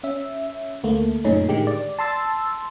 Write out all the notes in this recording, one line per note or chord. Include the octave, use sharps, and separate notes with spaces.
C#4 E5
D2 A3 A#3
F#2 A#2 C#3 A3 C#4 D#4
A2 D3 D#3 G#3 G4
D5
A5 C6 E6 A6